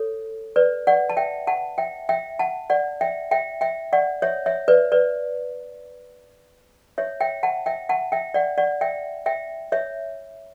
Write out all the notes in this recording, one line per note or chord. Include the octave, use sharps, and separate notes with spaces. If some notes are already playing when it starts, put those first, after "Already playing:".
Already playing: A4 C#5
B4 D5
D5 F#5
A5
E5 G5
F#5 A5
E5 G5
E5 G5
F#5 A5
D5 F#5
E5 G5
E5 G5
E5 G5
D5 F#5
C#5 E5
C#5 E5
B4 D5
B4 D5
C#5 E5
E5 G5
F#5 A5
E5 G5
F#5 A5
E5 G5
D5 F#5
D5 F#5
E5 G5
E5 G5
C#5 E5